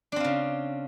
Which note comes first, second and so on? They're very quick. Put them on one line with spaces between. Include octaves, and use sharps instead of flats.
D4 C4 F4 C#3